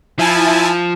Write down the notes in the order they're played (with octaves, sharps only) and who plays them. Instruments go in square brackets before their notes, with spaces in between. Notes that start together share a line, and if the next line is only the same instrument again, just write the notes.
[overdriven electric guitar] F3 [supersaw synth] E4 G#5 A5